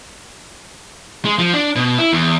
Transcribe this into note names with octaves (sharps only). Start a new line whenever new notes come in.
G#3
F3
D4
B2
E4
E2